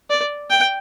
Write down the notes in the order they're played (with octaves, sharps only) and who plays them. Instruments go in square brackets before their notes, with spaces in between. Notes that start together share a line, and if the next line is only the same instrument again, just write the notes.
[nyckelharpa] D5
G5